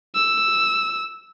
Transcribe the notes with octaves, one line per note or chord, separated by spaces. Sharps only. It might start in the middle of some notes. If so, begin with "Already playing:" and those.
E6